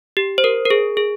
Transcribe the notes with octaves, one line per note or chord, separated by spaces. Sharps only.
G4
C5
A#4
A#4
G#4
G#4